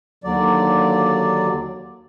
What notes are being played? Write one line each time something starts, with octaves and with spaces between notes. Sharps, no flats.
D#2 D3 F#3 D5